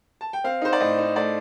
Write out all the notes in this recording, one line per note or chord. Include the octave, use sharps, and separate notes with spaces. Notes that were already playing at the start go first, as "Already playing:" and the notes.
A5
G5
C4 F5
D#4 C5
D5
A2 D#5
D#4
A3 D5